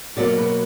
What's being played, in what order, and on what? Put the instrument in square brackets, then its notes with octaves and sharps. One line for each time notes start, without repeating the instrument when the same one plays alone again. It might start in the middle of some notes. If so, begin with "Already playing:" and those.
[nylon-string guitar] B2 F#3 A#3 D5
B4